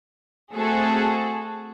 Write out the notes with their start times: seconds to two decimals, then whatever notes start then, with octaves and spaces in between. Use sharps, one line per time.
0.53 A3 C4 F#4 G#4 A4